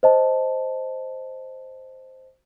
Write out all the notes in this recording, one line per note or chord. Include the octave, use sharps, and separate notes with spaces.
C5 D#5 A5